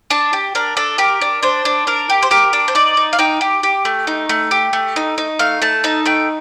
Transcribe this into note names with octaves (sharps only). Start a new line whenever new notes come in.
D4 A5
G4
D4 A#4
D4 A4
G4 A#4
D4
D4 C5
D4
D4 A#4
G4
C5
G4 A#4
D4
C5
D#4 D5
D#4
F5
D#4 G5
G4
G4
A3
D#4
A3
G4
A3
D#4
D#4
A3 F5
A3 A5
D#4 A5
A3 G5